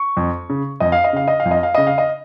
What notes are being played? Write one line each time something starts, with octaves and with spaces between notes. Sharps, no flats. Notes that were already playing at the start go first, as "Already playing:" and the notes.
Already playing: C#6
F2
C#3
F2 D#5
F5
D#5
C#3 F5
D#5
F5
F2
D#5
F5
C#3 D#5
F5
D#5